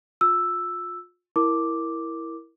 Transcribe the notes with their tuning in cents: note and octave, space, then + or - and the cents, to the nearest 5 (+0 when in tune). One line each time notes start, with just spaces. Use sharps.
F4 +35 E6 +0
E4 +0 A#4 +0 D6 +0